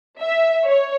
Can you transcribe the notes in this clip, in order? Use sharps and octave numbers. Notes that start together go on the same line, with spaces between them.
E5
C#5